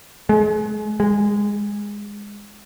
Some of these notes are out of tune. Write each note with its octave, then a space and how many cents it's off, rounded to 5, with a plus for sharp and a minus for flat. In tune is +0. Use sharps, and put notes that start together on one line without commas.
G#3 +35
G#3 -15